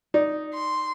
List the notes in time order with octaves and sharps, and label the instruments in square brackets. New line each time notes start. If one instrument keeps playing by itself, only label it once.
[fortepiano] D#4 [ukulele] D5
[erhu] C6